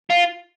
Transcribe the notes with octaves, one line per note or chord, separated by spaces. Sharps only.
F4